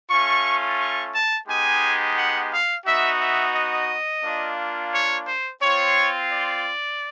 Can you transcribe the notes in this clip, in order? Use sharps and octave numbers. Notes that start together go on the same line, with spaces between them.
A3 C#4 F4 C#6
C#6
A5
G#3 B3 D#4 G4 G#5
F#5
F5
B3 D#4 F#4 E5
E5
D#5
A#3 D4 F4
C#5
C5
C4 F4 C#5
D5